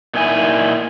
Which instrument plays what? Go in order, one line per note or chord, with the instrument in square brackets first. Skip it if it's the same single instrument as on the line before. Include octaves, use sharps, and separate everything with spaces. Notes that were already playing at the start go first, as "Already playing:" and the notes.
[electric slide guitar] A#2 D#4 E4 G#5